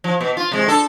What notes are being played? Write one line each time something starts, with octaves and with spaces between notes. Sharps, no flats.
F3
B2
F4
C3 G#3
D3 A4